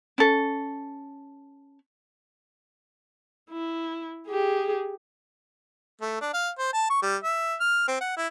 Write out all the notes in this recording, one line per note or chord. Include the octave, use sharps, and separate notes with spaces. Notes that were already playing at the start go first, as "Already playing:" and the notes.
C#4 A4
E4
G4 G#4
A3
D4
F5
C5
A5
C#6
G3
E5
F6
C4
F#5
E4